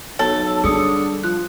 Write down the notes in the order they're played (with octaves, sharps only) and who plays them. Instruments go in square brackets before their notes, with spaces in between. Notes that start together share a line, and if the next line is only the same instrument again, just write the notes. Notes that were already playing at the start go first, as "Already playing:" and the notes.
[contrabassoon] B1 [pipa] A4 [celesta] C#5
[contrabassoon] D3 [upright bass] G3 [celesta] G#4 D#6 C#7
[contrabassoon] F3 [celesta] F#6